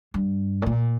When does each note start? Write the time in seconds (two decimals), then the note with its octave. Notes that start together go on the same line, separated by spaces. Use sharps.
0.14 G2
0.62 A2
0.66 A#2